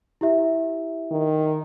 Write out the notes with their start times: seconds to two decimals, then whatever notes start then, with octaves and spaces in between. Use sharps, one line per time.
0.21 E4 G4 E5
1.11 D#3